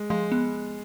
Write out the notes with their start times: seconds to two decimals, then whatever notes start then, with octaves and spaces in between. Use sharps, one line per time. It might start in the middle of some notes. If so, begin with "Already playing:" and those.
Already playing: G#3
0.10 F3 G#3
0.32 B3